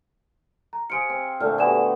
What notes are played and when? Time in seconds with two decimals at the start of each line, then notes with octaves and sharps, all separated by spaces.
0.73 A#5
0.90 G#4 C5 F5 C#7 D7
1.09 C4
1.40 A#2 D3 A3 F6
1.58 B3 F#4 G4 D5 G#5 E7